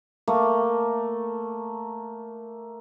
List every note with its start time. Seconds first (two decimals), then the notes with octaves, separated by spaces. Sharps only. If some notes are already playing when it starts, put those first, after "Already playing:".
0.28 A3 A#3